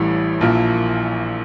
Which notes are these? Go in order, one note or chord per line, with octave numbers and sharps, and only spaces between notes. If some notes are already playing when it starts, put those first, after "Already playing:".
Already playing: A1 A2 E3 G3
A#1 A#2 F3 A#3 E4